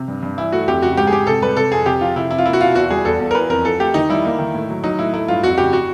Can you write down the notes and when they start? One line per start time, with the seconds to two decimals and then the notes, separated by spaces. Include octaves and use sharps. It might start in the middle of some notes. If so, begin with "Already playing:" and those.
Already playing: C3
0.08 G2
0.23 G2
0.38 E3 E4
0.52 A3 F#4
0.68 F2 G4
0.82 C#3 F#4
0.97 G#2 G4
1.07 G#4
1.12 G#2 G4
1.27 C3 A4
1.42 G3 B4
1.57 C3 A4
1.72 F2 G#4
1.86 C3 G4
2.01 F3 F4
2.16 C3 E4
2.31 C3 E4
2.38 F4
2.46 A#3 E4
2.53 F#4
2.60 B2 F4
2.75 E2 F#4
2.90 G3 G#4
3.05 E2 A4
3.20 E2
3.31 A#4
3.35 E3 B4
3.49 F2 A#4
3.65 F3 A4
3.80 A3 G4
3.94 D#3 D#4
4.10 G3 E4
4.25 A#3
4.39 D#3
4.54 A2
4.70 F#3
4.84 F#3 D#4
4.99 A2 E4
5.13 A3 E4
5.28 G2 F4
5.44 F2 F#4
5.58 C#3 G4
5.73 F#4